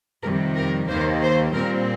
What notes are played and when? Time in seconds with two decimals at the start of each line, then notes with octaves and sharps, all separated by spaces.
0.24 F2 C3 D#3 G3 A#4
0.57 A#4
0.89 D#2 D#3 A#3 C5
1.22 C5
1.54 A#2 G3 C4 A#4